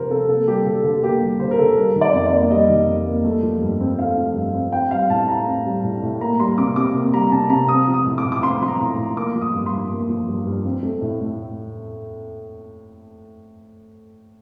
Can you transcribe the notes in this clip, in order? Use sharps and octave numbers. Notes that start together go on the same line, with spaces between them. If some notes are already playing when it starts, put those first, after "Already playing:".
Already playing: C3 F3 A#4 C5
C3 A4
A#3 A4
G3 G4
D3 A4
D3 A4
A#3 G4
G3
D3 C5
A#4
D3 A4
G3 A#4
D#3
D5
F2
D5
A#3
G3 D#5
D#3
F2
A#3
A3
F3
G2
C4
A3 F5
F3
G2
C4
C4 G5
G3 F5
A2 A5
A2 A#5
C4
G3
A2
A2
A#3 A#5
G3 C6
C3 D6
C3 D6
A#3
G3 A#5
C3 A5
C3 A#5
C4 D#6
F3
D#6
A2
D6
A2
D6
C4 C6
F3 C6
A#5
A2
A2
A#3 D6
F3
D#6
G2
C6
G2
A#3
F3
G2
G2
C4
A3
A2
A2